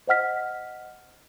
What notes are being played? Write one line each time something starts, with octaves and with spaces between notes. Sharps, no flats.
C5 D#5 F#5 F6 B6